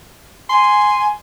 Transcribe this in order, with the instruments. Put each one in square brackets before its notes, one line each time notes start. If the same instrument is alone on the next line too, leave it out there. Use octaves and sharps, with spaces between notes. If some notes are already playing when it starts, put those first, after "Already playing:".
[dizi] G#5 [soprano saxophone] C6